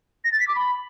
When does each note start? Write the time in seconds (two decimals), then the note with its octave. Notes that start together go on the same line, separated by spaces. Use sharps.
0.24 A#6
0.32 A6
0.40 B6
0.48 D6
0.56 B5